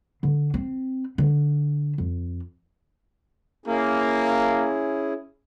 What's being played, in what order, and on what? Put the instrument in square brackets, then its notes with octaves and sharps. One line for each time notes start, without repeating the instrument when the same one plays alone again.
[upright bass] D3
C4
D3
F2
[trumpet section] A#3 [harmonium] C#4 E4 G#4